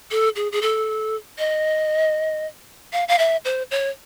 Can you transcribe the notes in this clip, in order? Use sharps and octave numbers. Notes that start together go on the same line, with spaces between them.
A4
G#4
G#4
A4
D#5
F5
F5
E5
C5
C#5